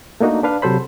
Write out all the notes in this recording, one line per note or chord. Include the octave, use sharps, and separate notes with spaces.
A3 A#3 D4 D#4 F#4
D4 B4 F5
C3 F#3 A4 C5 B5